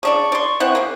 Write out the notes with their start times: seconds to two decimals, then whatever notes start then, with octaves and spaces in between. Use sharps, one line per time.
0.03 C#3 D4 D5 C#6
0.32 D5 C6
0.60 E3 C4 F#5
0.75 C#3 A#3